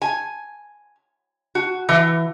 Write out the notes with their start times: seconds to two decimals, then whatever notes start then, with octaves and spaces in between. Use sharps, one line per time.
0.02 G#5
1.55 F#4
1.89 E3